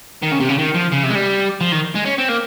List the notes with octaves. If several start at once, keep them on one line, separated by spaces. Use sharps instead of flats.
D#3
C#3
C3
C#3
D#3
F3
C#3
C3
G#3
G3
F3
D#3
G#3
C#4
C4
A#3